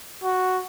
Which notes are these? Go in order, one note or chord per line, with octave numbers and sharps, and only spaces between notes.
F#4